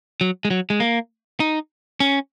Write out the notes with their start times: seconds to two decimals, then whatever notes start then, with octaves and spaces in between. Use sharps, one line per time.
0.21 F#3
0.45 G#3
0.51 F#3
0.70 G#3
0.80 A#3
1.40 D#4
2.00 C#4